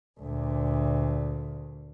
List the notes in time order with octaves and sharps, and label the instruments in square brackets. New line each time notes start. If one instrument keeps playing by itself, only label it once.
[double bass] D2 A#2